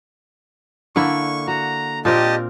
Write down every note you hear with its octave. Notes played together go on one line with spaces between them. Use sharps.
D3 A#3 E4 C#6
F#4 A#5
A#2 C4 G4 A#4 D#5 A5